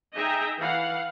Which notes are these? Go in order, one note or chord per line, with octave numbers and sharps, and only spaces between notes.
D#4 G#4 D#5 E5 G5 A#5
E3 F5 F#5